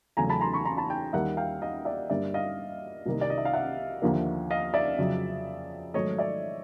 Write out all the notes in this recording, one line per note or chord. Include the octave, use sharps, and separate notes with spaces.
E2 C#3 F#3 A3 G#5 A#5
A5 B5
A#5 C6
B5 C#6
A#5 C6
A5 B5
G5 A5
D#2 D#3 G3 A#3 E5 F#5
F5 G5
D#5 F5
D5 E5
G2 D3 G3 A#3 D5 E5
D#5 F5
C2 C3 D#3 G3 A#3
D5
D#5
E5
F5
E5 F#5
D#2 D3 F3 A#3
D#5 F5
D5 E5
F2 C#3 F#3
G#2 D#3 F#3 A3 C#5 D#5
D5 E5